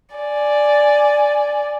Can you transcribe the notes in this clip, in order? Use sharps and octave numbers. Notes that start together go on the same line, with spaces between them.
D5 G#5